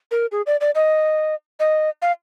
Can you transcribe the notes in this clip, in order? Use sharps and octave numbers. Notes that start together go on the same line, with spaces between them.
A#4
G#4
D5
D5
D#5
D#5
F5